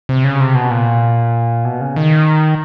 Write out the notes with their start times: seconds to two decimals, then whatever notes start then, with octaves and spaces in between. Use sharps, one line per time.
0.09 C3
0.24 C#3
0.40 C3
0.55 B2
0.71 A#2
1.65 B2
1.81 C#3
1.96 D#3